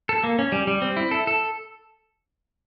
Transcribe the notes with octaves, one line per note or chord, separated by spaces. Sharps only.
A4
A#3
C#4
G3
G3
C4
E4
A4
A4